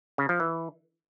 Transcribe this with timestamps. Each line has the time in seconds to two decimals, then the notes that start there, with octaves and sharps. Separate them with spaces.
0.18 C#3
0.29 F3
0.40 E3